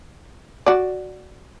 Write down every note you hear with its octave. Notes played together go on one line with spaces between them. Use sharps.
F#4 D5